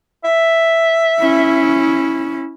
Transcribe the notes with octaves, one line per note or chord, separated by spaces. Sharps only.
E5
C#4 E4